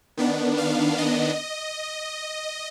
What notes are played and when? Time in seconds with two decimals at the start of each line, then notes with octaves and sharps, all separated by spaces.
0.17 D#3 B3 D4
0.58 F5
0.98 D#5